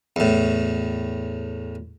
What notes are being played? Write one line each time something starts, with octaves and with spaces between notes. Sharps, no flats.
E2 A2